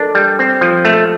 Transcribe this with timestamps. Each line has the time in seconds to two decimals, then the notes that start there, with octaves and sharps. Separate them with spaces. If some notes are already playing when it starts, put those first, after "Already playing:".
Already playing: D4 A4 A#4
0.15 G3
0.39 C4
0.61 F3
0.85 A3 A4